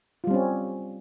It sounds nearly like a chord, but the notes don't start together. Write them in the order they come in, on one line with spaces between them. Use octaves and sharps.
F4 G3 C4 C#4